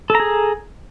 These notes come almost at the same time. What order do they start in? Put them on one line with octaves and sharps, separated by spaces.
A4 A#5 G#4